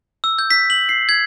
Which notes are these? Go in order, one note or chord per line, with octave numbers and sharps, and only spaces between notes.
E6
G6
B6
F#7
C7
G#6